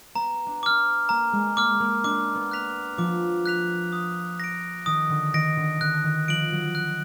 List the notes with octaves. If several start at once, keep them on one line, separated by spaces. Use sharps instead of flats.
B3 A#5
D4
D4 D6 F6
A#3 A#5
G#3
A#3 D6 F6
A#3
D4 D6
B3
F#6 B6 F7
F3 D6
F#6 B6 F7
D#6
A#6 D7
D#3 D#6
D3
D#3 A#6 D7
D3
D3 F#6
D#3
F3 D7 F#7
F#3
F#6